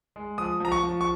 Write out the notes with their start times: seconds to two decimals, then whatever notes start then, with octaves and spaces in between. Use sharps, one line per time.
0.16 G#3
0.38 F3 D#6
0.60 F3 A#5
0.72 C#6
0.83 F3
1.01 C#6